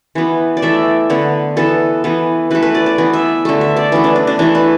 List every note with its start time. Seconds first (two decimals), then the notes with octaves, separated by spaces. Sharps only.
0.15 E3 B3
0.57 D5
0.62 E3 A3 E5
1.10 D3 B3
1.57 E3 B3 A4
2.04 E3 B3
2.51 E3 A3 B4
2.62 B4
2.75 D5
2.86 D5
2.98 E3 B3
3.13 E5
3.45 D3 A3
3.61 E5
3.77 D5
3.92 E3 A3 B3
4.04 D4
4.16 D4
4.27 D4
4.39 E3 A3 D4
4.55 B4